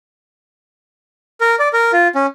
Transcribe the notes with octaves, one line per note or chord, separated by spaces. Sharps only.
A#4
D5
A#4
F4
C#4